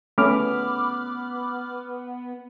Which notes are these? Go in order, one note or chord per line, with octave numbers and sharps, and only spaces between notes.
A3 B3 C#4 B5 D6 F6